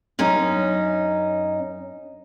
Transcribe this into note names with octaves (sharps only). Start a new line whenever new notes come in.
F#2 C#4 D#4